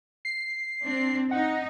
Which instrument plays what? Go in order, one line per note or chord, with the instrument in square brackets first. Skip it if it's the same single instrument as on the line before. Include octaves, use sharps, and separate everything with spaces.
[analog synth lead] C7
[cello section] C4 D4
[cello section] D#4 [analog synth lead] F#5